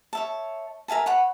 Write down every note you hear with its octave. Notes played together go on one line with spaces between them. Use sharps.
C#5 E5 A5
A#4 E5 G#5 A5
C#5 F#5 B5